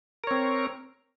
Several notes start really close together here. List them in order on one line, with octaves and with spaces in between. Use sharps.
A#4 C#5 C4